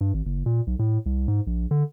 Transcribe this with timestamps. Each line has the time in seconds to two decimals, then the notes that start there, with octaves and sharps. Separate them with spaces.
0.01 G2
0.14 G#1
0.26 F#1
0.46 A#2
0.67 B1
0.79 A2
1.06 C2
1.28 G#2
1.47 A#1
1.71 D3